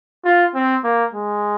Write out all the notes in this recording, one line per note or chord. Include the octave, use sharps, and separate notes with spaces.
F4
C4
A#3
G#3